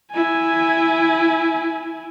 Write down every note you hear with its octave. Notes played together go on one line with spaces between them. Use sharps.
E4 G#5